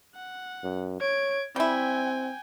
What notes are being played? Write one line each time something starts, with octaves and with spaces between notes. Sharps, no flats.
F#5
F#2
C#5 G#6 D7
G3 C4 E4 G5 G#5